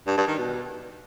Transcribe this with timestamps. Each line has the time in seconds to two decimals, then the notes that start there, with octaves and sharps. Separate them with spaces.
0.07 G2
0.17 G2
0.28 D#3
0.38 B2